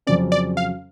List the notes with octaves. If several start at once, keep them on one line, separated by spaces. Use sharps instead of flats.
F2 C#3 F#3 C#4 D5
D5
F5